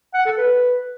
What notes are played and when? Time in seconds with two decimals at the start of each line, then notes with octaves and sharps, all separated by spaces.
0.14 F#5
0.26 A4
0.38 B4